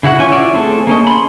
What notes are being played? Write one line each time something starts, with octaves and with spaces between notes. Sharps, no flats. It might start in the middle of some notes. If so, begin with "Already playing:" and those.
C#3 E4 F#4 F#5
E3 C#4 F4 G#5
C#4 E4 D5
A3 C4 G#4 A4
A#3 C#4 D#5
B5 C6